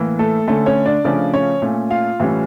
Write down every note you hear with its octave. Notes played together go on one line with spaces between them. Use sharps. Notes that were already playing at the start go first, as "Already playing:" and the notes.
Already playing: A2 E3 A#3
A3 A4
D3 A3 C#4 A4
C#4 C#5
D4 D5
C#3 F3 A3 C#4 D4 D5
C#4 C#5
A#2 A3 C#4
F4 F5
A2 E3 G3 C#4